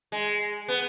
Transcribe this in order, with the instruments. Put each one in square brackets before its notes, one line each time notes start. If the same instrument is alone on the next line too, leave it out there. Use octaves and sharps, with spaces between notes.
[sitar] G#3
B3